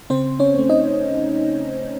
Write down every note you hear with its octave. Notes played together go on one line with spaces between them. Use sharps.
C#3 C4 C5
C#4 C#5
A3 C4
D#4 D#5